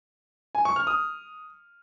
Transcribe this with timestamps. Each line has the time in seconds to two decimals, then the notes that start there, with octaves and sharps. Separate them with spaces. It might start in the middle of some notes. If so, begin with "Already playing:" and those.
0.55 G#5
0.65 C#6
0.76 F6
0.87 D#6